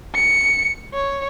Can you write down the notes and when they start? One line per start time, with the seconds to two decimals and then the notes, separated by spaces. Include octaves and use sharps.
0.15 C#7
0.94 C#5